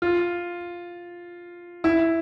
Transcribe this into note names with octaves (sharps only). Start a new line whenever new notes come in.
F4
E4